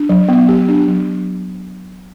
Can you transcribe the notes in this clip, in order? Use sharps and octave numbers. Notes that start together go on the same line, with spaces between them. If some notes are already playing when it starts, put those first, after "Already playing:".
Already playing: D4
F#3
B3
G4
D4
F#3